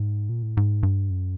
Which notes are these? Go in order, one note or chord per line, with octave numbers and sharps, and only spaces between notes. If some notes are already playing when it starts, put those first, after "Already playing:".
Already playing: G#2
A#2
A2
G#2
G2
F#2